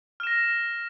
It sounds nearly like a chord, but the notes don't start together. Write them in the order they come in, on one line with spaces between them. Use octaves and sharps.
F6 E7 A#6